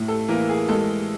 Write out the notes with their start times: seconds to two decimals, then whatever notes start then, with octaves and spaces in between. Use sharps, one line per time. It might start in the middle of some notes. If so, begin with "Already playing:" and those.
Already playing: A2
0.08 A4
0.28 E3 A#3 A#4
0.49 G#4
0.69 G#3 A4